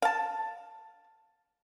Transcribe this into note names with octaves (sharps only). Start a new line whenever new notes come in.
F5 A5